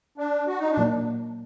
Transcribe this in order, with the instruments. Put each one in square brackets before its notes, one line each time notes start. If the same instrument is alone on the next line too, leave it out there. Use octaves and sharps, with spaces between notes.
[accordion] D4
F#4
D#4
D4
[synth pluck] A#2 F#3 A#3